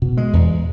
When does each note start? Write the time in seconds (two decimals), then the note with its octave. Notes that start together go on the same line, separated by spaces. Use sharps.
0.02 B2
0.17 G#3
0.33 E2